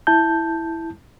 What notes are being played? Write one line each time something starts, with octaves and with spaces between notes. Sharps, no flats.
E4 A5 G6